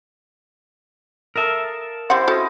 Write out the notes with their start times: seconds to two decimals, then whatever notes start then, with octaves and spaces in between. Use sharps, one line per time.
1.36 A4 A#4 E5 F5 D#6
2.10 G3 C4 E4 G4 C5 F#5
2.28 C#4 F#4 A4 D#5